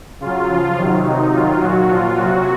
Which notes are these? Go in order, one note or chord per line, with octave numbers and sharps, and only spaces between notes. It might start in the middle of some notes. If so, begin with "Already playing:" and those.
C#3 F#3 F4
C#3 F3
C3 D#3 F#3
C3 F#3 D#4
C3 D#3 F#3 F4
A#2 F#3 F#4
A#2 F3 F4
C3 F#3 F#4